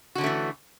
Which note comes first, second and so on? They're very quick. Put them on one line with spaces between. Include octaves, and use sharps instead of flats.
F#4 D3 C#4 A3 E3